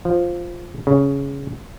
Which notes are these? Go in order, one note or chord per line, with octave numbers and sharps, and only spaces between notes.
F3
C#3